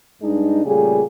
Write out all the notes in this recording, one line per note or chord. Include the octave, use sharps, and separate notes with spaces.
G2 G#3 D4 D#4
A#2 C#3 G3 A3 G4 G#4